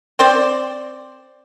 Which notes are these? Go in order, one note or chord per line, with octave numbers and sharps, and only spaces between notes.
C4 C5 D5